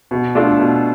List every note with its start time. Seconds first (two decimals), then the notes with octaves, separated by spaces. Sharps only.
0.11 B2
0.35 A3 D4 F4 A4
0.59 B2